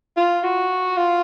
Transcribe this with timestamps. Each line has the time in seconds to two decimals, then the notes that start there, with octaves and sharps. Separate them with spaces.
0.17 F4
0.43 F#4
0.97 F4